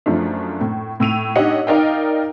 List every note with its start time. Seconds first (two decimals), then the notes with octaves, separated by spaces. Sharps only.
0.06 F#2 F3 A3 D4
0.61 A2
1.00 A2 E6 D#7 F7
1.36 D4 D#4 G4 C#5 D#5 F#5
1.67 D#4 A#4 D5 D#5 F5 G5